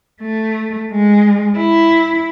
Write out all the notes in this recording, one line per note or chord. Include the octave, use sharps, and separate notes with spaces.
A3
G#3
E4